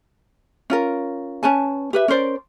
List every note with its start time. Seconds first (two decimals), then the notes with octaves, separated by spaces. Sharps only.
0.70 C#4 F4 A#4
1.43 C#4 B4 G#5 A5
1.93 G4 B4 E5
2.08 C#4 A#4 C5 D5